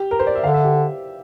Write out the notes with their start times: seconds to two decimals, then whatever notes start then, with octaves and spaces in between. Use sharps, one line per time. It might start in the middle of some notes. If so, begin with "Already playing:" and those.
Already playing: G4
0.11 A#4
0.19 C5
0.27 D5
0.35 E5
0.44 D3 F5
0.54 E5
0.64 G4